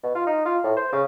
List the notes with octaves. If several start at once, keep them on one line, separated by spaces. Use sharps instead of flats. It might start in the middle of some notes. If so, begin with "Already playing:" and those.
B2
F4
D#4
F4
A2
C5
C#3